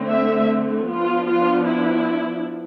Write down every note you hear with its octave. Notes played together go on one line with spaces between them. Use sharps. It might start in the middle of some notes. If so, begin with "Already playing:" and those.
Already playing: D3 A3 C4
E5
F3 B3 D4 F4
F4
E4